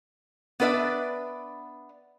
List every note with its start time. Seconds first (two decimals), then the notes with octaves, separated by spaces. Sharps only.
0.60 B3 D4 B4 D5 E5